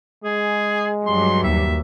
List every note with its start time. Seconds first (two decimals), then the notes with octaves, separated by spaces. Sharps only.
0.24 G#3 G#4
1.06 G2 F#3 G3 C6
1.43 D#2 E5